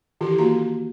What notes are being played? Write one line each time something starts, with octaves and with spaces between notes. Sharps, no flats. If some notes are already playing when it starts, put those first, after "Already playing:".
D#3 E3 E4 F4 G4 A4
A#3 F#4 A#5